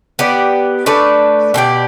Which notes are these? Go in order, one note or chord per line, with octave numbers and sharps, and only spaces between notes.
B3 G4 D5
A3 D4 B4 D5
B2 B3 G4 D5